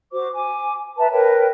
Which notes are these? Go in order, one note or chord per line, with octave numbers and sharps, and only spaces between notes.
F#4 C5 D6
G#5 D6
B4 E5 A5 A#5
A#4 B4 C#5 G5